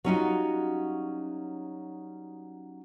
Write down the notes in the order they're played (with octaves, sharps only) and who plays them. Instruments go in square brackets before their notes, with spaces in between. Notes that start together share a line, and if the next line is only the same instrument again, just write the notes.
[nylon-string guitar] F#3 G3 C#4 D#4 F4 F#4